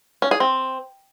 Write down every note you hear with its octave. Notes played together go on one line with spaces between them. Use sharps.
C#4
G#4
C4